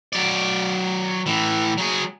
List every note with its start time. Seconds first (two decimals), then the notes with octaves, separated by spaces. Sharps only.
0.13 F#3 D5
1.26 A2 E3
1.77 F#3 G#4